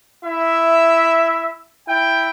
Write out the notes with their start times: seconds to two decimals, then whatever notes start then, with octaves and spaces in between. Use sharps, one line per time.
0.25 E4 E5
1.88 E4 G5